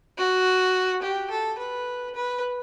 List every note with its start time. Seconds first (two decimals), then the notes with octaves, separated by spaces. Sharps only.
0.18 F#4
1.02 G4
1.30 A4
1.58 B4
2.15 B4